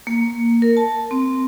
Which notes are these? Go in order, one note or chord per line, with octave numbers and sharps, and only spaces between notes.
A#3
A#4
A5
C4